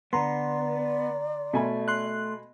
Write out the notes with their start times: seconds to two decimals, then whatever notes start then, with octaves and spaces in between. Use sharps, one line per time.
0.13 D3 B3 D5 A#5 C6
1.53 B2 A3 G#5 B5
1.88 C6 F#6